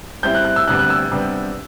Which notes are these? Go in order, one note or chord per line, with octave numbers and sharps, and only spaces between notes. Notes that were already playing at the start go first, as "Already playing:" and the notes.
A2 G3 C4 E4 G6
F#6
F#6
E6
D2 C3 G3 B3 D4 F#6
F#6
E6
C3 G3 B3 D4